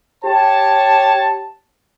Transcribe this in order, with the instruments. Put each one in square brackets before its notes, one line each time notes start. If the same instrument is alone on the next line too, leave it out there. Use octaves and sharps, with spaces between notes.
[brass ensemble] G4 C#5 A5